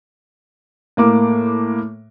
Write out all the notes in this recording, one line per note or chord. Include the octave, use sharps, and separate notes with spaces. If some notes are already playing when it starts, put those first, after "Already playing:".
A2 A#3 D6